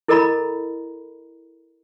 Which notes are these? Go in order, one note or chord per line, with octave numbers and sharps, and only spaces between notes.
E4 A4 A#4 D#5 A#5 B5